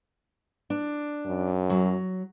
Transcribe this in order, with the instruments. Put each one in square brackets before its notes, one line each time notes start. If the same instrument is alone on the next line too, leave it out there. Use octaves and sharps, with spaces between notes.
[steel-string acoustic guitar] D4
[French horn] F#2
[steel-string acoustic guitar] F#3